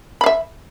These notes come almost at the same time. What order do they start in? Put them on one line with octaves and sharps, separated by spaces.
B5 F5 E5